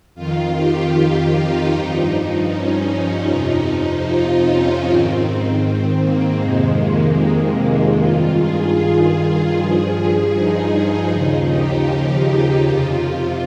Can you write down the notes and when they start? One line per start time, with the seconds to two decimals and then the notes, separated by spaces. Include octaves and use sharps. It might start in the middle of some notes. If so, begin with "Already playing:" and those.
0.15 F2 D#3 F4
0.55 G4
0.94 F4
1.32 D#4
1.72 G2 F3
2.50 C#4
2.89 C#4
3.28 F2 C3 F3 D#4
4.07 F4
4.46 C#4
4.85 G#2 D#3 C4
5.24 C4
6.02 A#3
6.41 F2 C3 D#3 G#3
6.81 A#3
7.98 G2 D#3 F4
8.37 G#4
8.76 G#4
9.55 G2 F3
10.33 D#4
10.72 D#4
11.11 D#2 C#3 F3
11.50 G4
12.29 G4
12.68 F2 C3 F3 F4